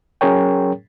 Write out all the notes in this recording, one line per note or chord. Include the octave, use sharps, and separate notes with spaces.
F#3 C#4 G#4 A#4 C#5 G5